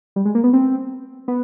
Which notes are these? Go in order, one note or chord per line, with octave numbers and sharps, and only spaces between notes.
G3
G#3
A#3
B3
C4
B3